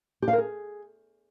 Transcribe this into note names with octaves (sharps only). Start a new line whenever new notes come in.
G4
F5
A#4
G#4